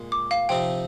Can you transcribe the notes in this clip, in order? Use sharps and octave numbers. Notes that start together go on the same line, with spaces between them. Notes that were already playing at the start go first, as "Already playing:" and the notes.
Already playing: A#2 G#3
D6
F5
C3 F3 C4 D#4 G5